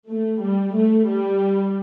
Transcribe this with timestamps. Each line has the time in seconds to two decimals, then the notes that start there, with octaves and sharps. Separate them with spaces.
0.08 A3
0.41 G3
0.74 A3
1.06 G3